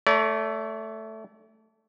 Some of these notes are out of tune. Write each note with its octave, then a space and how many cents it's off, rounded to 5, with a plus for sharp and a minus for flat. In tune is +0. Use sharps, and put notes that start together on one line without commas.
A3 +0 D5 -40 A#5 +40